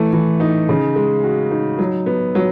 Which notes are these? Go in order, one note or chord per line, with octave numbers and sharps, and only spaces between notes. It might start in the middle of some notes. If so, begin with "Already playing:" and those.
Already playing: E3 A3
E3
D#4
C#3
G#3
F#4
D#4
F#3
B3
F#3